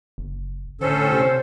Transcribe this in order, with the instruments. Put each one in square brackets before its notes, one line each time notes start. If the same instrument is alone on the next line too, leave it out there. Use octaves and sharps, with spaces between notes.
[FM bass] F#1
[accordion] A2 C#4 A4 [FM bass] D3 [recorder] C5
[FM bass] C3